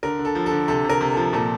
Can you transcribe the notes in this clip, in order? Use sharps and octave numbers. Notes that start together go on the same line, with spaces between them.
D3 A#4
D3
A4
F3
A4
D3
C3 A4
C3
A#4
C3
F3 A4
A#2 A4